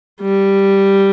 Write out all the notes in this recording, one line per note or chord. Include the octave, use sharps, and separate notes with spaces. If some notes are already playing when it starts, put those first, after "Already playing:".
G3